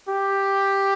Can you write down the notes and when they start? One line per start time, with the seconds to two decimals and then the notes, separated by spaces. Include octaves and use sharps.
0.09 G4